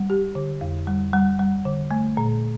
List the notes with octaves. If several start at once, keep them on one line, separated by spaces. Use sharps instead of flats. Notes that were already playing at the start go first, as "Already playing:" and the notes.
Already playing: G3
G4
D3
F2
G3
G3
G3
D3
A3
A#2